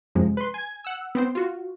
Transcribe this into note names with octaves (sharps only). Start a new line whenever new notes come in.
F#2 C3 F3 G#3
B4 C6
G#5 G#6
F#5 E6
B3 C4 C5
F4 F#4